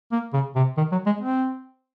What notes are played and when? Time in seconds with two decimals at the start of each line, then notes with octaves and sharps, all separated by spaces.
0.12 A#3
0.33 C#3
0.55 C3
0.77 D#3
0.91 F#3
1.06 G#3
1.21 C4